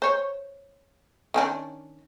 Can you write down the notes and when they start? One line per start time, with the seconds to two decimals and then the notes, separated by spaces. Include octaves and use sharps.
0.02 C5 C#5
1.34 D#3 C#4 D4